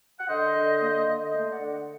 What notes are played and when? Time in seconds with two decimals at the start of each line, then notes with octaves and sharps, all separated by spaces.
0.19 F#5
0.28 D3 C5 D#5
0.55 D3
0.81 A#3
1.06 D3
1.32 A3 C5 D#5
1.42 D#5
1.49 D5 F#5
1.58 D3
1.66 D5 F#5